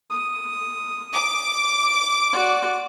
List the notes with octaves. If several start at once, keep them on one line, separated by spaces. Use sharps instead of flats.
D#6
D6
F#4 D5